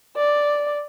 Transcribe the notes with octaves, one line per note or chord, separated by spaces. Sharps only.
D5